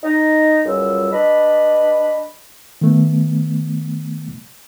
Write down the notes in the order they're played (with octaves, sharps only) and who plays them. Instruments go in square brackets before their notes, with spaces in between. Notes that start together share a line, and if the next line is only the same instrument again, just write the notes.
[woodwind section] D#4
C#2 F#2 G3 F4 E6
D4 B4 D#5 B5
[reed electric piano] D#3 A3 B3